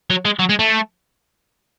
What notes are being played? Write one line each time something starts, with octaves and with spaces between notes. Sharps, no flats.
F#3
G#3
F#3
G#3
A3